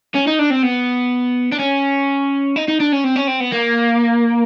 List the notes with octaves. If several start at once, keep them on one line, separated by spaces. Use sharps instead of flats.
C#4
D#4
D4
C4
B3
D4
C#4
D#4
D#4
D4
C#4
C4
C#4
C4
B3
A#3